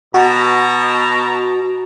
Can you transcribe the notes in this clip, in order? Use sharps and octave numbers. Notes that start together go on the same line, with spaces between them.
B2 F#4 A5 A#5